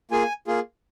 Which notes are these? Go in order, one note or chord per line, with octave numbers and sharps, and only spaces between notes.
A#3 F4 G#4 G#5
A#3 F4 G#4